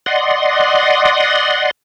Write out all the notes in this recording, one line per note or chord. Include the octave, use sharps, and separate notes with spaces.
D5 D#5 F#5 C6